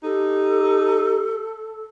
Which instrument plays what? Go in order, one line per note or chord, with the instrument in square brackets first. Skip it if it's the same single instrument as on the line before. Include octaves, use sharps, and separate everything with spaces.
[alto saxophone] D#4 [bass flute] G4 [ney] A4